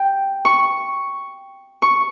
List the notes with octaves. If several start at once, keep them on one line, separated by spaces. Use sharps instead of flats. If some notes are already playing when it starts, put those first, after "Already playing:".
Already playing: G5
C#6
C#6